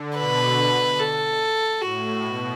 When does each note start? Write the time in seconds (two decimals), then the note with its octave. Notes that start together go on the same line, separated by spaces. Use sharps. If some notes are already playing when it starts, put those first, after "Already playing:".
Already playing: D3
0.17 B2 B4
0.99 A4
1.82 A2 F#4
2.23 B2